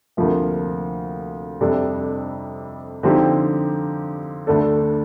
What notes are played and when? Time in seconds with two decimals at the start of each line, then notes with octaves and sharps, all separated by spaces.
0.17 D2 C3 F3 A#3 F4
1.61 F2 C3 G3 D4 A4
3.03 D3 F3 C4 D#4 G4
4.47 D2 D3 A3 D4 A4